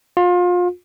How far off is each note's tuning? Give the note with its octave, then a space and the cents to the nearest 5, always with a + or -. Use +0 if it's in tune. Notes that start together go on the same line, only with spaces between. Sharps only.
F4 +30